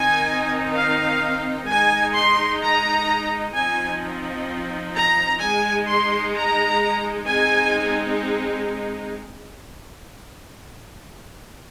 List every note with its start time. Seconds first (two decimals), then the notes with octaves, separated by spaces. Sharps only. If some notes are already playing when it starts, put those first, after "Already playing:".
Already playing: D#3 C4 D#4 G#5
0.75 F5
1.68 G#3 D#4 G#5
2.16 C6
2.62 A#5
3.54 F3 C4 D#4 G#5
4.94 A#5
5.41 G#3 D#4 G#5
5.87 C6
6.35 A#5
7.27 G#3 C4 D#4 G#5